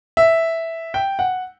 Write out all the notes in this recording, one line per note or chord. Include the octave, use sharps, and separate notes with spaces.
E5
G5
F#5